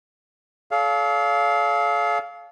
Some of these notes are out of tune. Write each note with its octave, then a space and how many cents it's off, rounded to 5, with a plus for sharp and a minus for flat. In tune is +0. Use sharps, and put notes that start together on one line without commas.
A4 -45 D5 -45 F5 +0